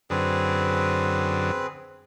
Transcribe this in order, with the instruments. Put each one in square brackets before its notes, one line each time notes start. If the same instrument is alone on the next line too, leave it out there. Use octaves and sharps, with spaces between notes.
[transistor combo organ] F#2 D3 [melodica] C4 G#4 B4